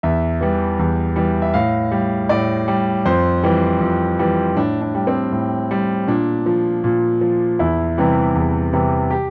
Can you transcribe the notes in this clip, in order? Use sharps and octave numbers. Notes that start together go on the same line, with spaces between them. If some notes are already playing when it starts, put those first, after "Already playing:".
E2 E5
E3 G3
E2
E3 G3
E5
A2 F5
G3
A2 D5
G3
F2 C5
E3 G3
F2
E3 G3
A2 D4
D4
G3
C4
A2
G3
A#2 D4
F3
A#2
F3
E2 E4
C3 E3 G3
E2
C3 E3 G3
G4